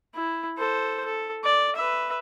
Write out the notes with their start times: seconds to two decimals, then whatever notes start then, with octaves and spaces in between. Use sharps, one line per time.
0.14 E4
0.58 A4 C5
1.05 A4
1.44 D5
1.76 B4 E5